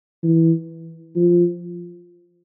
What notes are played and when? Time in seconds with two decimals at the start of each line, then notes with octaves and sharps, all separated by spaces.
0.23 E3
1.16 F3